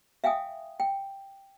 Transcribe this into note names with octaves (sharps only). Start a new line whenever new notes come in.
E5 F5 G5 G#5 D#6
G5